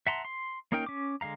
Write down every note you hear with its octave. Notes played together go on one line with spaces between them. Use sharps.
E5 F#5 A5 A#5 C6
C6
A#3 C#4 D#4 A#4 G5
C#4 D6
D3 G#3 F5 A#5